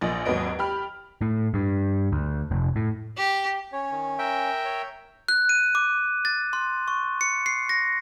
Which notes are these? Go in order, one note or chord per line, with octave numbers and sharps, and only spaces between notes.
A#1 A#2 D#5 A6
G#1 D#2 F#3 B4 D#5 D7
G4 B5 F6
A2
G2
D2
F1
A2
G4
C#4 C#5
D#3
A#4 E5 G5
C#5
F#6
D#7
D6
A6
C6
C#6
C#7
C7
A#6